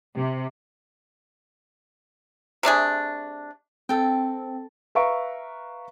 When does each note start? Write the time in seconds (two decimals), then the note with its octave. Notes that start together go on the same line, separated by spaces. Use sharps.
0.15 C3
2.63 C3 A3 D4 G#4
3.89 C4 A4 G5
4.95 B4 E5 F5 A#5 C#6 D7